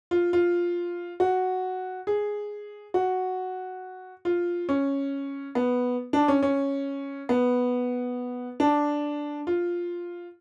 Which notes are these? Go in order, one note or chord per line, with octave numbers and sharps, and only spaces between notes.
F4
F4
F#4
G#4
F#4
F4
C#4
B3
D4
C#4
C#4
B3
D4
F4